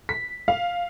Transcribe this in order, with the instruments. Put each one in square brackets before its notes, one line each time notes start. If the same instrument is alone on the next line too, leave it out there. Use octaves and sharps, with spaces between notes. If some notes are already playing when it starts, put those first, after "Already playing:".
[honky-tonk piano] B6
F5